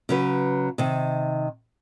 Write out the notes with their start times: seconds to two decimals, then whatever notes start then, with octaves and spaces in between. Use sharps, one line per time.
0.09 C#3 F#3 B4
0.78 C3 D#3